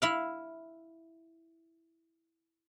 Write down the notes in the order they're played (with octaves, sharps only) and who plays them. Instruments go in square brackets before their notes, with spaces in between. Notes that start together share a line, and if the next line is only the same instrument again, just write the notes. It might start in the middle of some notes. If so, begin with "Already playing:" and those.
[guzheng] E4 E5 F5